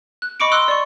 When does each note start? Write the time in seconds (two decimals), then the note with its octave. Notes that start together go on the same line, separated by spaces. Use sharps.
0.22 F#6
0.40 D#5 B5 C#6 D6 C#7 D7
0.52 C6 D#6 E6 F#6
0.68 D5 C#6